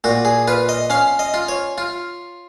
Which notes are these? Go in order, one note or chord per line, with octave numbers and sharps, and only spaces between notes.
A#2 F#4
G#4
F4 B4
D#5
C#4 F5
D#5
F4
C#5
F4